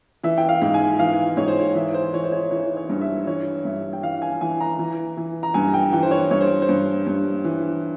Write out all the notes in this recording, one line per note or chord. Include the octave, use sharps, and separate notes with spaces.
E3 E5
G5
F5
G#2
G#5
E3 F5
G#2 C#5
C5
C#5
E3 E5
C5
E3 C#5
C5
C#5
E3 C#5
C#5
G2
E5
E3 C#5
G2 E5
G5
E3 F5
G#5
E3 G#5
A#5
E3
E3
A#5
G2 G#5
G5
E3 G5
C5
C#5
G2 C#5
C5
C5
G2
G2
E3